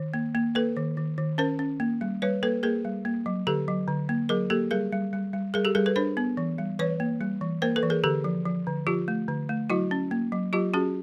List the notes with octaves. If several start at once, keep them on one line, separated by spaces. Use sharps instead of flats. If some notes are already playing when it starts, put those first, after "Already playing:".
Already playing: D#3
A#3
A#3
A#3 A4 B4
D#3
D#3
D#3
C#4 A#4 C5
C#4
A#3
G3
G3 B4 C#5
A#3 A4 B4
A#3 G#4 A#4
G3
A#3
F#3
D3 G4 A4
F#3
D3
A#3
F#3 G#4 A#4
A#3 G4 A4
G3 G#4 A#4
G3
G3
G3
G3 G#4 A#4
G4 A4
G3 G#4 A#4
A4 B4
D4 A#4 C5
B3
E3
G3
E3 B4 C#5
A#3
G3
E3
A#3 A#4 C5
A4 B4
E3
G#4 A#4
D3 G4 A4
F3
F3
D3
F3 F4 G4
A3
D3
A3
F#3 E4 F#4
C#4
A#3
F#3
F#3 F4 G4
C#4 F#4 G#4